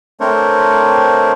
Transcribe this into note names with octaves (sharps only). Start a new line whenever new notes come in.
A3 C4 D4 A#4 C5 C#5